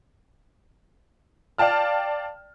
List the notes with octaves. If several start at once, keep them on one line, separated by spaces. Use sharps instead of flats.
D5 F5 G5 A5 F6